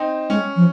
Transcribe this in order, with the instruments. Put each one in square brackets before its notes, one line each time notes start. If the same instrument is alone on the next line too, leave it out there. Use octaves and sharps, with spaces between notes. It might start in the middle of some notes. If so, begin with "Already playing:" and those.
Already playing: [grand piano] C4 D#4
[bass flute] G#3 [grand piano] C#4
[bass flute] F3